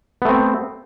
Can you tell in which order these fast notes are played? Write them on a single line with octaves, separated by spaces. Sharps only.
B3 A3 C4